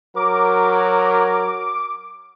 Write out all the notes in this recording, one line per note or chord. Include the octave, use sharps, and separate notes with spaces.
F#3 A#4 D6